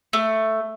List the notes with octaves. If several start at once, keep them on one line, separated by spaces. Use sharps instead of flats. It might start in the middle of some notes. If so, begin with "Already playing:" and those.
A3